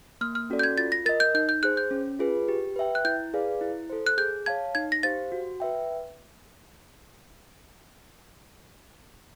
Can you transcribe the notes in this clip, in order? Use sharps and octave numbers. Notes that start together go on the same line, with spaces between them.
A#3 F6
F6
C#4 F#4 A4 D5
G6
G#6
F4 A6
A#6
A#4 D#5 A6
G6
D#4 G6
G6
G#4 C5 F#6
G6
C#4
F4 G#4 B4
G4
B4 E5 G5
F#6
E4 G6
G#4 B4 D5 F5
E4
A4 C5
F#6
G#4 G6
C#5 F5 A5 G#6
D#4 G#6
A#6
G4 C5 F5 A6
F#4
B4 E5 G5